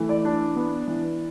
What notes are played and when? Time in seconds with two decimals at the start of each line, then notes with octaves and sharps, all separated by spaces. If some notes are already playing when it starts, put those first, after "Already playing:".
Already playing: E3 A3
0.09 D5
0.25 D4
0.56 B3
0.87 E3